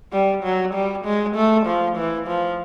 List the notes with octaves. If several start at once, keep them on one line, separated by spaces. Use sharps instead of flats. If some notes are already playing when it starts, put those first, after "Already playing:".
G3
F#3
G3
G#3
A3
F3
E3
F3